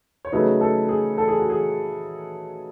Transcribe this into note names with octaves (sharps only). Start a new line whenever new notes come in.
C#5
C#3 F#3 A3 D#4 B4
A4
G#4
A4
G#4
F#4
G#4